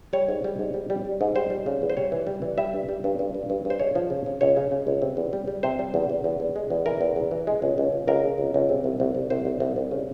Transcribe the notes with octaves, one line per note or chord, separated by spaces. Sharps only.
G3 C#5
G#2
G3
G#2
G3
G3
G3
G#2
G3 C5
G3
C#3
E2
C5
G3 C#5
E3
G3
E3
G3 E5
G2
G3
G2
G2
G2
G2
G2
C5
G#3 C#5
F3
C#3
C#3
C#2 C#5
C#3
C#3
C#2
C3
E2
G3
G3
C3 C5
G3
E2
E2
E2
E2
G#3
E2
E3 A#4
E2
E2
E3
G#3
C#2
C#2
C#2
C#2 A#4
G#3
C#2
C#2
C3
C2
C2
C2
C2 C5
C2
C2
C2
C#3